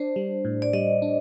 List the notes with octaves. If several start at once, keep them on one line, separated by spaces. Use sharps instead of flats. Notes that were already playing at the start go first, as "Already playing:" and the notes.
Already playing: D4 C5
G3
A2
D5
G3 D#5
D4